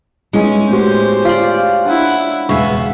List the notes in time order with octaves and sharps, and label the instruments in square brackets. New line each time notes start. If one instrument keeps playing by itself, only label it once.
[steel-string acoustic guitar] G#3 C#4 [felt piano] B3 D#4 E4
[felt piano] A2 B3 F#4 [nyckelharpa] G4 C5
[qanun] F4 D5
[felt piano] D4 [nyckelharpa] E4 F#5
[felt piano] E1 C#6 [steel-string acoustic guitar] C#3 G#3 B3 [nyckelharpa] E5